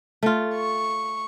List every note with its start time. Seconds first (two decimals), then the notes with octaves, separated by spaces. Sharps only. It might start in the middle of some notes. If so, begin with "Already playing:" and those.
0.23 A3 F4
0.55 C#6